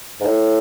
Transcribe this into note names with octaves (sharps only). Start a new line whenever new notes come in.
G#2
A2